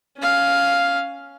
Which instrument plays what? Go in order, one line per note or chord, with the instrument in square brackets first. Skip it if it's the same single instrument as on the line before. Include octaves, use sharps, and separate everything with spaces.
[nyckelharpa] C#4 F5